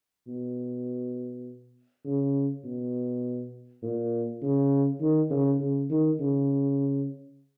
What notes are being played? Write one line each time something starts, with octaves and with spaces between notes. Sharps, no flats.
B2
C#3
B2
A#2
C#3
D#3
C#3
C#3
D#3
C#3